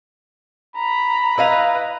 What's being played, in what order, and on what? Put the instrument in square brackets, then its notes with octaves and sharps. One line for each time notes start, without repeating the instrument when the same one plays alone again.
[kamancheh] A#5 [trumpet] B5
[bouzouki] E4 D#5 F5 [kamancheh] B4 A#5